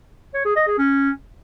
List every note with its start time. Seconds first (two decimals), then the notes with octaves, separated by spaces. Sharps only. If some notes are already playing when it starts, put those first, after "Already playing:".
0.34 C#5
0.45 G#4
0.56 D#5
0.67 G#4
0.78 C#4